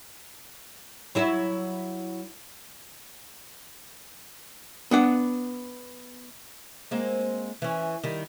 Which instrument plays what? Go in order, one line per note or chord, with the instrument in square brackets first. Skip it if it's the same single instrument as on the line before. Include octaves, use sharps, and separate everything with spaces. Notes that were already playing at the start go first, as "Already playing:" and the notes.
[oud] F#3 E4 E5
[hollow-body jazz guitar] B3 D4 F#5
[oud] G#3 A#3 C4
E3 C#4
D#3 G3